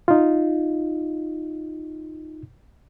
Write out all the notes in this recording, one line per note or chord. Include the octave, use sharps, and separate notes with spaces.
D#4 F4